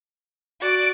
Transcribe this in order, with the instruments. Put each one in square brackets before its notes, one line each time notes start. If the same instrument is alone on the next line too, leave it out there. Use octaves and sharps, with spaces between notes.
[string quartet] F#4 D5 [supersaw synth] D7